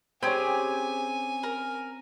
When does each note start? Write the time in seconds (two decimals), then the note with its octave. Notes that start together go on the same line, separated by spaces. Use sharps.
0.23 C4 C#4 G4 G#4 G#5
1.43 A#4